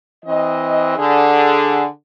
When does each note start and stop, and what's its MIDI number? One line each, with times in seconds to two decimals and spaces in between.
0.25 0.94 52
0.25 0.94 60
0.25 0.94 75
0.96 1.85 50
0.96 1.85 68